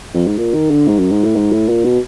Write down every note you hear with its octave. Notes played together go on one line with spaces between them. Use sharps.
F2
G#2
A#2
D#3
D3
G#2
F#2
G#2
A2
G#2
A2
A#2
B2